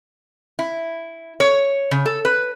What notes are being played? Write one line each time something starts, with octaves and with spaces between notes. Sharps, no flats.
E4
C#5
C#3
A4
B4